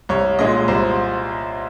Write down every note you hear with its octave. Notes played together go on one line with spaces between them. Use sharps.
C2 C#5
A#2 G#3 D#5
C2 C5